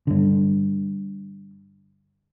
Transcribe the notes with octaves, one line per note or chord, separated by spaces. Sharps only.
G2 D3